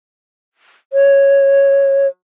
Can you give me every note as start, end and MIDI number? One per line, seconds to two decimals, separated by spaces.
0.93 2.07 73